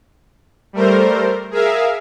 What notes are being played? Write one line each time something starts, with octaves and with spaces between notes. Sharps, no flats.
G3 A3 A#4 C5
G#4 A#4 E5 F5